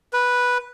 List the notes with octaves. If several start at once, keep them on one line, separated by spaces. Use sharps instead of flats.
B4